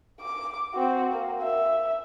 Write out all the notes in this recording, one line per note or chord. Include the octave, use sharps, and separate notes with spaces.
D6
C4 F#4
A#3
E5